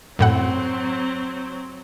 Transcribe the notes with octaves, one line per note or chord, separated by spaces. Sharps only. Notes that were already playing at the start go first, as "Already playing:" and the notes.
F#2 A2 F#3 C4 F#5